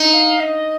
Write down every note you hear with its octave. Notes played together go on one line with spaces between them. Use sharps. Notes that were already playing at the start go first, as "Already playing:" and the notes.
Already playing: D#4
F5
D#5